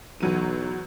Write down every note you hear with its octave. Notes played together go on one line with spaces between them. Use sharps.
B1 E2 F#3 D#7